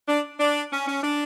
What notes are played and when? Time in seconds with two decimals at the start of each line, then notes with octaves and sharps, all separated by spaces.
0.08 D4
0.40 D4
0.72 C#4
0.88 C#4
1.03 D4